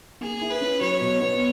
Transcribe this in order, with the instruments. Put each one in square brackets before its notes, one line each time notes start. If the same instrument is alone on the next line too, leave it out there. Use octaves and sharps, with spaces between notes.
[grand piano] A#3 [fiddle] G#4
[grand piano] E4
[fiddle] B4
[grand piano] C#4
[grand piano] F#3 [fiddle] C#5
[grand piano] B2
B3